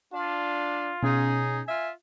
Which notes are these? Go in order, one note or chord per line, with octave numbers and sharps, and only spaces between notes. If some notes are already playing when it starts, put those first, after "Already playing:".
D4 F4
B2 C#4 D#4 G#4
F4 E5 G#5